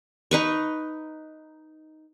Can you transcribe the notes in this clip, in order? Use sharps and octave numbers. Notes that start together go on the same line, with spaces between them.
D#4 B4 C#6